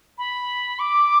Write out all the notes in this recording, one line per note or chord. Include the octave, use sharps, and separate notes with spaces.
B5
D6